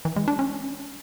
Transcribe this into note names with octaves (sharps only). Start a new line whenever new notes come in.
E3
G#3
D4
C#4